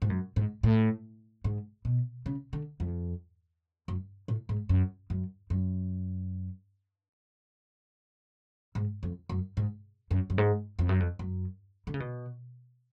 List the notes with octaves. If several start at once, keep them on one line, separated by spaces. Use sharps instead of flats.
G#2
F#2
G#2
A2
G#2
B2
C#3
D3
F2
F#2
A2
G#2
F#2
F#2
F#2
G#2
F2
F#2
G#2
F#2
F#2
G#2
F2
F#2
F2
F#2
D3
C#3
B2